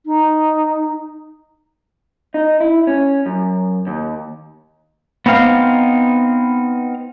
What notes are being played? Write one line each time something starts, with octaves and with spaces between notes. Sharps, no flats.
D#4
D#4
E4
C#4
F#2
D#2
B3 C4 D#4 F5